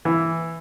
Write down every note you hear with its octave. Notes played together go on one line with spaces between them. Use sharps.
E3